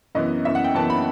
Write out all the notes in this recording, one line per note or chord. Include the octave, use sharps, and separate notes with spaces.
F#2 E3 B3 D#5
F#2 E3 B3 E5
F#5
G5
F#2 E3 B3 A5
B5